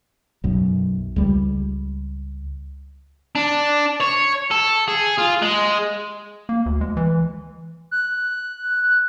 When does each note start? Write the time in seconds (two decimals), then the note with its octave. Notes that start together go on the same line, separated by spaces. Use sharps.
0.44 B1 F#2
1.16 C#2 G3
3.35 D4
4.01 C#5
4.51 A4
4.88 G#4
5.18 F4
5.42 G#3
6.49 A#3
6.66 D2
6.81 G#3
6.97 E3
7.91 F#6